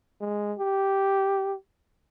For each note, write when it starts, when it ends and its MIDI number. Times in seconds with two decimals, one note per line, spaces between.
0.21 0.53 56
0.59 1.54 67